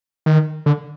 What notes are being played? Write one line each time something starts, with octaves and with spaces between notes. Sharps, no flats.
D#3
D3